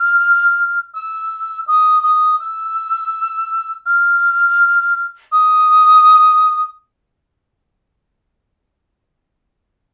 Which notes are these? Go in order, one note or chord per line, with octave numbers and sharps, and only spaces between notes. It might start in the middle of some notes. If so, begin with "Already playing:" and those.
Already playing: F6
E6
D#6
D#6
E6
F6
D#6